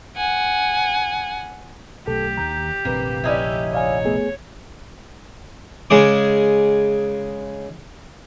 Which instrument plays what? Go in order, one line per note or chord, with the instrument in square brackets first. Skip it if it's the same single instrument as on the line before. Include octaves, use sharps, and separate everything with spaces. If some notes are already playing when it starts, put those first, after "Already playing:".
[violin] F#5 G#5
[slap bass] B1 A3 [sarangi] G4 [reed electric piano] A4
[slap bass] D#2 D#3 [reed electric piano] A#5 G6
[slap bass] F1 A#1 D3 [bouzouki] A#3 [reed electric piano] C4 B4
[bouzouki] C#4 D#4 E4
[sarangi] C#5 [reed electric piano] D5 F5 G#5
[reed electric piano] A3 B3 G#4
[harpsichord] C#3 G#3 G#4 D6